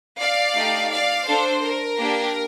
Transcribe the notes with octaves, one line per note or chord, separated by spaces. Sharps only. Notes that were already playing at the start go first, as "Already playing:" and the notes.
D5 F5
A3 D#4 G4
D5 F5
D4 A4 C5
A#4
A#3 D4 G4